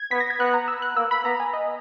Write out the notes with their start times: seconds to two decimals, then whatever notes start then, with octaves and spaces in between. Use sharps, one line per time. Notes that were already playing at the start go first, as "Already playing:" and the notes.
Already playing: G#6
0.11 B3 B6
0.20 A#6
0.30 G#6
0.39 B3 F#6
0.54 A#5
0.68 E6
0.82 F#6
0.96 A#3 E6
1.11 B5
1.25 B3 A#5
1.40 G#5
1.53 D#5